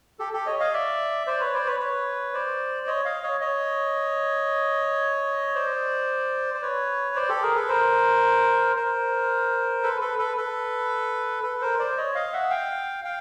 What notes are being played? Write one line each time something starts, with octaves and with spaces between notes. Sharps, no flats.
G4 A4
G4 A4
C#5 D#5
D#5 F5
D5 E5
C5 D5
B4 C#5
C5 D5
B4 C#5
B4 C#5
C5 D5
C#5 D#5
D#5 F5
C#5 D#5
C#5 D#5
C5 D5
C5
B4 C#5
C5 D5
G4 A4
G#4 A#4
A4 B4
A#4 C5
A#4 C5
A4 B4
A4 B4
A4 B4
A4 B4
A4 B4
A#4 C5
C5 D5
C#5 D#5
D#5 F5
E5 F#5
F5 G5
F5 G5